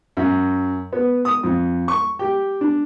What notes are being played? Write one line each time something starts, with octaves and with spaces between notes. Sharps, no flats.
F#2
B3
D#6
F2
C#6
G4
D4